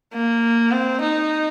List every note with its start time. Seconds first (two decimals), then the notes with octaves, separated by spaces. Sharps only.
0.14 A#3
0.71 C4
1.01 D#4